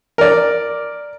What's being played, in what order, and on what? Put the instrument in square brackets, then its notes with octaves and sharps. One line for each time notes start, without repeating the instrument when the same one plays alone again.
[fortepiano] A#4 D5